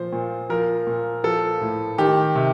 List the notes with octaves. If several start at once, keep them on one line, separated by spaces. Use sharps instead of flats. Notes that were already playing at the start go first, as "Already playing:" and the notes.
Already playing: A#2 F3 C5
A#2
F3 A#4
A#2
F3 A4
A2
D#3 G4
C3